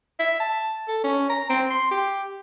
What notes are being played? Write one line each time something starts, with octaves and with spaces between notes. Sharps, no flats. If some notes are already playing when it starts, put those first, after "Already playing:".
E5
A5
A4
C#4
A#5
C4
C6
G4